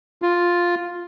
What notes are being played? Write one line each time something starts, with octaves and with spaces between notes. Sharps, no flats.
F4